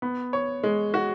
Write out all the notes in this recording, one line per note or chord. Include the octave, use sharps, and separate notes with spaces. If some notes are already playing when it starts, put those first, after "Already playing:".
B3
C#5
G#3
F#4